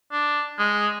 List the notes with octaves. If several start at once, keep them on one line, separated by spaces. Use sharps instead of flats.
D4
G#3